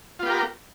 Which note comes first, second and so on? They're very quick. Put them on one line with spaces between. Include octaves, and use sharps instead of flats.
F4 B3 G4 A#4